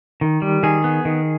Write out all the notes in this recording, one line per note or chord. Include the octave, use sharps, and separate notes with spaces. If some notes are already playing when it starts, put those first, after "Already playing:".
D#3
G3
D#3 G#4
B3
D#3